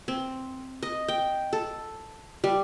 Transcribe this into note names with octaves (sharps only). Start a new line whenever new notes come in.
C4
D#5
G5
A4
G3